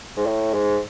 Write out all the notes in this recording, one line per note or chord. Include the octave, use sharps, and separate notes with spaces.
G#2
A2
G#2